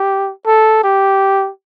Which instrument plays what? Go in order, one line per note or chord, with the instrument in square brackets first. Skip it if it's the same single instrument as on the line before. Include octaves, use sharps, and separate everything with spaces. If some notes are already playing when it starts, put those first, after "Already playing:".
Already playing: [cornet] G4
A4
G4